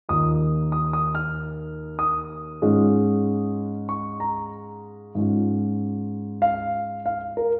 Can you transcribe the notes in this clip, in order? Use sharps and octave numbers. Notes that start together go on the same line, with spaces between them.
D#2 D#3 A#3 F4 D#6
D#6
D#6
F6
D#6
G#2 G#3 C#4 F4
C#6
A#5
G#2 G#3 C#4 F4
F5
F5
A#4